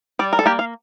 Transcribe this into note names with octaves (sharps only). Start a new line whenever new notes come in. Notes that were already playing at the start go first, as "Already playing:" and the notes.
G3 D5
A#4
A4
A#3 G4
F5